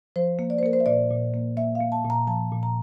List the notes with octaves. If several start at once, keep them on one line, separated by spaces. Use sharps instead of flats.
F3 C5
A#3
D5
C5
A#3 A#4
C5
E5
A#2 D5
A#2
A#3
A#3 E5
F5
A#3
A5
A#2
A#5
F3 A5
A#2
A#5